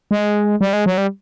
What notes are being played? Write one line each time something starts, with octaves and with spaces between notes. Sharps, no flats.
G#3
G3
G#3
F#3
G3